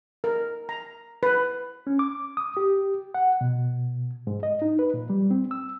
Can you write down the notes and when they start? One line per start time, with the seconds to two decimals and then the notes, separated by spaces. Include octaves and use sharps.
0.24 A#4
0.69 A#5
1.23 B4
1.87 C#4
1.99 D6
2.37 D#6
2.57 G4
3.14 F#5
3.41 B2
4.27 G#2
4.43 D#5
4.62 D#4
4.79 B4
4.94 A#2
5.10 G3
5.31 C4
5.51 E6